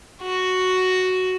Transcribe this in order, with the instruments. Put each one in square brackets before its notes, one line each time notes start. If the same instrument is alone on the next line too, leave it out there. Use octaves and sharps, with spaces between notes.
[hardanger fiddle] F#4